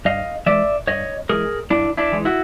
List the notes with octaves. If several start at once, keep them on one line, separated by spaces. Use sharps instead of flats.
G2 D#5 F5
E3 G#3 D5 E5
G2 C#5 D#5
E3 G#3 G#4 A#4
G2 D4 E4
D4 E4
E3 G#3
E4 F#4